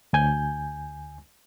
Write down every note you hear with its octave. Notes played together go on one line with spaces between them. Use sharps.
D2 G#5 G6